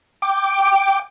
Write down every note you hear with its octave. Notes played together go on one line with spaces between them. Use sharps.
G5 D6